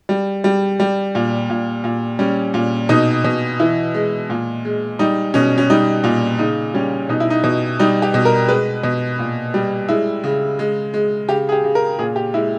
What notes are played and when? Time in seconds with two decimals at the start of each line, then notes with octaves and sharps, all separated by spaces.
0.09 G3
0.44 G3
0.80 G3
1.15 A#2
1.50 A#2
1.84 A#2
2.19 G3 C#4
2.54 A#2
2.89 B2 D#4
3.24 B2
3.60 E3 E4
3.94 G#3
4.30 A#2
4.65 G#3
4.99 G3 D#4
5.34 B2 C#4
5.58 C#4
5.70 G3 D#4
6.04 A#2
6.39 C#3 D#4
6.74 G3 C#4
7.09 B2 D#4
7.20 E4
7.30 D#4
7.44 B2
7.79 G3 D#4
8.02 G4
8.14 B2
8.25 A#4
8.49 G#3 B4
8.83 B2
9.19 A#2
9.54 G3
9.89 G#3 E4
10.24 C#3
10.59 G#3
10.94 G#3
11.28 C#3 G4
11.49 G#4
11.52 G4
11.64 C#3
11.75 A#4
11.99 A#2 G#4
12.16 G4
12.34 G#3 E4